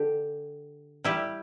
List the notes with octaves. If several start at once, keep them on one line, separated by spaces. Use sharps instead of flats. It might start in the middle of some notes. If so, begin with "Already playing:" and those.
Already playing: D3 G4
G3 E4 G4